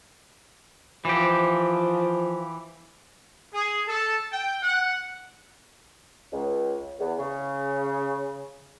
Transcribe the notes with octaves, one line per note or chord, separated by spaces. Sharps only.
E3 F3 G4
G#4
A4
G5
F#5
C#2
E2
C#3